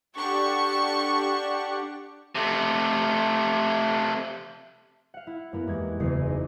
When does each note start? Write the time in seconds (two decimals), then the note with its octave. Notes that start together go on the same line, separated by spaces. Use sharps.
0.15 D4 G4 A4 F#5 C#6
2.35 C3 A3
5.14 F5 F#5
5.27 E4
5.52 F#2 A#3 B3 E4
5.67 E2 G#3 G4 G#6
6.00 F#1 E2 C#3 G#4 C7 D#7
6.27 D4 D#4